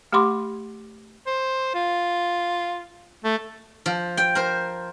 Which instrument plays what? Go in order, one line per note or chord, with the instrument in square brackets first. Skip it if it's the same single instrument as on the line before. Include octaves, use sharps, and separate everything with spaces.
[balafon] A3 G4 F#5 B5 C6 D6
[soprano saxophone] C5
F4
A3
[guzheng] F3
G5
A#4 C5